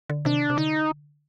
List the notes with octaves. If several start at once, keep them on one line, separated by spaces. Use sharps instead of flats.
D3
C3 D#3 D4
C3
D3 D#4